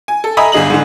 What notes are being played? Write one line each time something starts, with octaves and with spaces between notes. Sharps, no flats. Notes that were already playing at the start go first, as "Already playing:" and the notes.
G#5
A4
D#5 E5 G#5 A#5 B5 D#6
G1 D3 G#4 D#5 F#7
G#2 D3